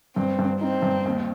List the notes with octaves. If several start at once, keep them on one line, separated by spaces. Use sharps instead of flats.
G2 C4
G2
C4 D#4
G2
D#2